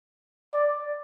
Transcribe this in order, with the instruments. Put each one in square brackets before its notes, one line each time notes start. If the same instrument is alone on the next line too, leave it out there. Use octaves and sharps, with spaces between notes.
[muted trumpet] D5